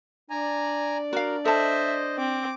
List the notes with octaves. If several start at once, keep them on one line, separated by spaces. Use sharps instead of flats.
D4 D5 G#5 A#5
F#4 A#4 F5
A4 C5 D#5 E5 A5
C4 D6